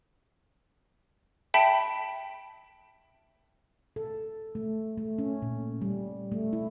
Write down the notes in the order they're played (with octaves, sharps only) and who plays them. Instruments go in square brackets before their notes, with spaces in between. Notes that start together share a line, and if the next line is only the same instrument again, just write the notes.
[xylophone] E5 G5 A5 B5 B6 D7
[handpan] A4
A3
A3
C#4
A#2
G3
A3
E4